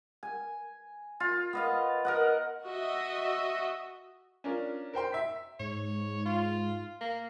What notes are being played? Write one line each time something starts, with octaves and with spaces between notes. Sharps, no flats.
G#5
F4
B3 D#5 F5
A#4 D#5 F#5
F#4 D#5 E5
C#4 D4 F4 A#4
A#4 C5 G5 C6
E5 B6
G#2 C#5
F4
A#3